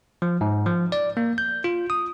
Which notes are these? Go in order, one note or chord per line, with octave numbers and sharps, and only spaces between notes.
F3
G#2
F3
D5
A#3
G6
F4
D#6